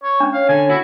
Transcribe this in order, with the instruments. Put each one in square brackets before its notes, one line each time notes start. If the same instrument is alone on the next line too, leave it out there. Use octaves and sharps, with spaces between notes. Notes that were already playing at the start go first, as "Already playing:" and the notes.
[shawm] C#5 [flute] C#6
[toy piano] C#4 D4
[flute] C#5 [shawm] F5
[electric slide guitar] D3 [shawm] G#5
[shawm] E4 [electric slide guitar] F#4